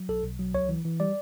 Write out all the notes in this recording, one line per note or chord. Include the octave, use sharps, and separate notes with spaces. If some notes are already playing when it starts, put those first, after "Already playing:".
Already playing: F#3
B1 A4
B1
F#3
C#2 C#5
E3
E3
G3 D5